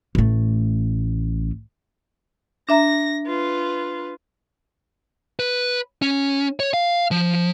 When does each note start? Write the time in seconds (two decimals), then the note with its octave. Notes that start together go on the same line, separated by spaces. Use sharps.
0.15 A1 A3
2.69 D4 E5 A#5 A#6
3.27 F4 B4
5.40 B4
6.02 C#4
6.60 C#5
6.74 F5
7.11 F3